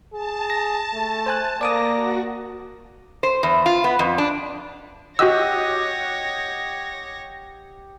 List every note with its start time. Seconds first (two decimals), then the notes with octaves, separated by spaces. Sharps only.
0.13 G#4 A5
0.50 A#6
0.94 A3
1.26 C5 G#5 F#6
1.61 A#3 D5 D6 D#6 A#6
1.95 F#4
3.23 C5
3.43 E2
3.66 F4
3.84 B3
3.99 F2
4.18 D4
5.19 F#4 G4 C#5 D#5 F#5 E6 A#6